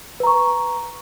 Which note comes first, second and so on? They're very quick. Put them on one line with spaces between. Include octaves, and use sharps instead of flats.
B4 A#5 C#6